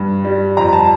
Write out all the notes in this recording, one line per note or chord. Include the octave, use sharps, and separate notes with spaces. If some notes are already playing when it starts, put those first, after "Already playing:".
Already playing: G2
G3
F2 A#5
A5